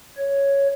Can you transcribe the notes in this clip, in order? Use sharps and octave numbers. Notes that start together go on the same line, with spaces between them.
C#5